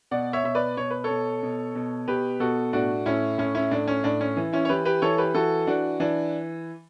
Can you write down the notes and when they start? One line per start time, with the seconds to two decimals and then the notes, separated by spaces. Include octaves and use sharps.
0.11 B2 D5 F#5
0.33 C#5 E5
0.44 B2 E5
0.55 B4 D5
0.77 B2 C#5
0.90 B4
1.04 A4 C#5
1.10 B2
1.43 B2
1.75 B2
2.08 B2 G4 B4
2.40 B2 F#4 A4
2.73 A2 D4 F#4
3.06 A2 C#4 E4
3.38 A2 C#4
3.55 C#4 E4
3.71 A2 D4
3.88 C#4
4.04 A2 D4
4.21 C#4
4.37 E3
4.53 C#4 E4
4.65 C#5
4.69 E3 G4 B4
4.85 G4 B4
5.02 E3 A4 C#5
5.18 G4 B4
5.34 E3 F#4 A4
5.67 E3 D4 F#4
6.00 E3 D4